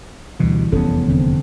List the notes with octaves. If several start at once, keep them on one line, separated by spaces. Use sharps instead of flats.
D2 B2 E3 G3
F1 E2 B3 C#4 A4
D3 C4